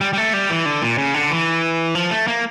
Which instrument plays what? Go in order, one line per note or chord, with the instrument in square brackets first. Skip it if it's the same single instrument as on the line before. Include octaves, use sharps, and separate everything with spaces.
[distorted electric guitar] G3
G3
A3
G3
E3
D3
A#2
C#3
D3
E3
F3
A3
A#3